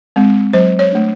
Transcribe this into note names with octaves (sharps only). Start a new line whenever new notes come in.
G#3 C4
F#3 C5
C#5
A3 D4